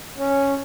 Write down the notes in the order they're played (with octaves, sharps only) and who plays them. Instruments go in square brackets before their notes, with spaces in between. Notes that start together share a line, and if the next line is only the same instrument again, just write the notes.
[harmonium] C#4